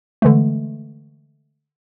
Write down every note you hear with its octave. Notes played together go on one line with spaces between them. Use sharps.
D3 E3 G#3 A3